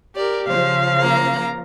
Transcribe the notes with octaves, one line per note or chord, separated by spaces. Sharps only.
G4 A#4 D5
C#3 F3 C5 F5
A#3 A#5